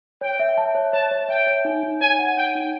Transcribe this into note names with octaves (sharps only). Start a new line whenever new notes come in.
C#5 G5
E5
A5
C#5
C#5 A5
C#5
E5 G5
C#5
D#4
D#4
C#5 G#5
F#5
D#4 G5
D#4